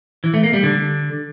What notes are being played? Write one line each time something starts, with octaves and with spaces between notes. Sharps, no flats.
E3
A3
A#3
G3
D3